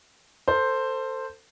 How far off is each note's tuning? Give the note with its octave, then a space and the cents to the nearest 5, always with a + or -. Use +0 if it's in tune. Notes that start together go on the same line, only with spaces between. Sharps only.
A4 +30 C5 +0